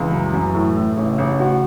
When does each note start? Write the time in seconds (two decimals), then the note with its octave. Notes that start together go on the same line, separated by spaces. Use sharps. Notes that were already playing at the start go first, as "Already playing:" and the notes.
Already playing: C#2 E3
0.12 F#2
0.34 F#2
0.54 A2
0.76 A2
0.97 A1 C#3
1.18 A1
1.40 F#4